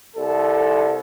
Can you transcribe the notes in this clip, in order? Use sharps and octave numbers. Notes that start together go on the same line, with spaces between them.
C2 A4